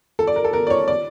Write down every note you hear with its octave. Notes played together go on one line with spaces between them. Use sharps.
A4
D5
A#4
A4
A#4
D5
C#5
D5